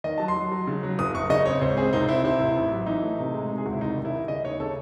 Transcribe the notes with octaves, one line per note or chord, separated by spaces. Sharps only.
D#3 D#5
F#3 A5
C6
F#3
F#3
C#3
F#3
F#1 D#6
F#2 C#6
C#3 D#5
C4 C#5
C#2 C5
C4 G#4
C2 D#4
C4 E4
C3 E4
A1
A1
F#3
E3 D#4
A3
C3
G#3
C3
G#4
C#2 F#4
E4
C2 D#4
D#3
E4
D#3
C#3 D#5
D#2 C#5
C#3 A4